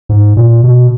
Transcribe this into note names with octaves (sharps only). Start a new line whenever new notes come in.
G#2
A#2
B2